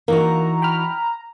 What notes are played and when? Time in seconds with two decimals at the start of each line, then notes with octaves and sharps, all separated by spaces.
0.08 E3 A#3 D#4 F#4 A#5
0.62 G5 B5 F6